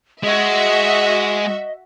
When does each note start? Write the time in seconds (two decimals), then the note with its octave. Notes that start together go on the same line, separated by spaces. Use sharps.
0.23 G#3 F#4 D#5 E5